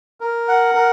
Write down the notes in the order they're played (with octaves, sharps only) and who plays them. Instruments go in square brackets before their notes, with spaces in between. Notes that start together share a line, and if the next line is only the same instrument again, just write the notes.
[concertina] A#4
F#5
A#4